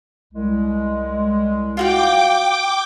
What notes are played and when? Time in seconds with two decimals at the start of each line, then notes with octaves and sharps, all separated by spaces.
0.34 C2 G#3
1.77 F4 F#4 F5 G5 D6